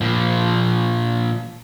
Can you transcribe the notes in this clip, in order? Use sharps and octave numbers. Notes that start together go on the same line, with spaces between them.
A#2 F3